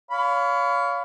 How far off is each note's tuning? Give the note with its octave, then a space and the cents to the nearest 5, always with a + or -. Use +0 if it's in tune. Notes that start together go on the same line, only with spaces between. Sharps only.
C#5 +30 F5 +0 B5 +25